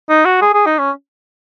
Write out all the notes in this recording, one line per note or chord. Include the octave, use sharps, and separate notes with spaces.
D#4
F#4
G#4
G#4
D#4
C#4